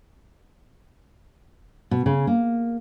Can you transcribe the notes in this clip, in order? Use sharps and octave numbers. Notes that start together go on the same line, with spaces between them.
B2
C#3
A#3